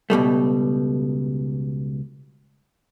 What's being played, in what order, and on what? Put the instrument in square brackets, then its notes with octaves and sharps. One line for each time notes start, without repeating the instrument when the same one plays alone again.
[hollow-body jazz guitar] C#2 B2 G3 A3